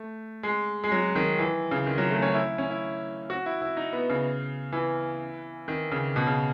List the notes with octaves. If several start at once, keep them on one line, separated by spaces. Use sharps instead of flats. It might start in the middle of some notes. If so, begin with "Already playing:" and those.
Already playing: A3
G#3
G#3
F#3
D#3
E3
C#3
D#3
F#3
A3
C#4
E4
C#4
E4
F#4
E4
E4
D#4
B3
C#3
E3
D#3
C#3
B2
C#3